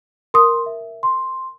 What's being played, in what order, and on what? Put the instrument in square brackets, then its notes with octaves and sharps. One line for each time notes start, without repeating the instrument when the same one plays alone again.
[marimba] A#4 D#6 [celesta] C6
[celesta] E5
C6